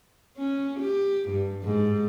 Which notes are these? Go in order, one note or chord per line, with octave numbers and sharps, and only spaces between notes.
C#4
G4
G2
G#2